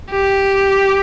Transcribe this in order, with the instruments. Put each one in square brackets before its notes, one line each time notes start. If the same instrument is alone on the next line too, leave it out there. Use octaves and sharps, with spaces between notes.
[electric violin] G4